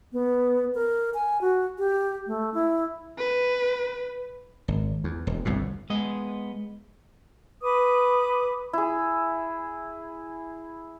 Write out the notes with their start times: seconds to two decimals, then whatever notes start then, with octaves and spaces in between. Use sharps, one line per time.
0.13 B3
0.75 A#4
1.14 G#5
1.41 F#4
1.78 G4
2.27 A3
2.54 E4
3.18 B4
4.68 G#1
5.04 E2
5.27 E1
5.45 G1 C2 F2 A2
5.90 G#3 B3 D#5
7.64 B4 D6 D#6
8.73 E4 G#4